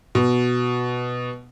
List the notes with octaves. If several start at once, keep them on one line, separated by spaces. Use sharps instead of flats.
B2